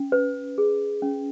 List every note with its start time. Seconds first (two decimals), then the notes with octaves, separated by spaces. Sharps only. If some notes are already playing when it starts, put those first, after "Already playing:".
Already playing: C#4
0.12 B4
0.58 G#4
1.02 C#4